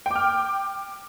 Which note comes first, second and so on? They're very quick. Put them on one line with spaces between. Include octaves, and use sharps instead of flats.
G5 D6 F6